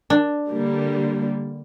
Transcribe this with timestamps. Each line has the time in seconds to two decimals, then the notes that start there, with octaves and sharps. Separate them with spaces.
0.10 D4
0.48 D3 G3 A#3